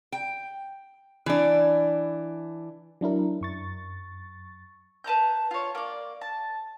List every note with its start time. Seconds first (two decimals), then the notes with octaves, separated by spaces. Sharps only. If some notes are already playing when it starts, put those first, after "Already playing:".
0.12 G5
1.26 E3 D4
3.01 F#3 D4 E4 A#4
3.41 F#2 C#6 A6
5.04 B4 A5 A#5 G6
5.51 F4 C#5
5.75 A#3 D5
6.21 A5